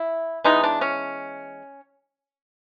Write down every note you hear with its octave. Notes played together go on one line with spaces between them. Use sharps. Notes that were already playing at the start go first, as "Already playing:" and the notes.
Already playing: E4
E3 G#3 B3 D#4
D4
C#4